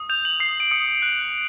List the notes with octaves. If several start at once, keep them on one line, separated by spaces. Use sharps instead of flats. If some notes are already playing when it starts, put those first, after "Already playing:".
Already playing: D#6
G6 F7
F#7
D#6 C7
D7
D#6 C#7
F#6